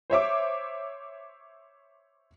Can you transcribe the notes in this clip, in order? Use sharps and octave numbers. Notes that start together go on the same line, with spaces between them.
C5 C#5 E5 D6